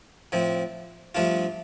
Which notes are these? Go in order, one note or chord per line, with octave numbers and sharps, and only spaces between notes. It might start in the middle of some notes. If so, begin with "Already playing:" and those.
A2 F3 C4
G2 F3 A3 D4 F4